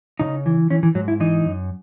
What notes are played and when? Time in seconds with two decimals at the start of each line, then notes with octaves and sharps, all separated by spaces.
0.19 C#3 D#4
0.46 E3
0.70 E3 C#4
0.83 E3
0.95 G#2 F#3
1.08 E4
1.20 E3 D#4
1.45 F#2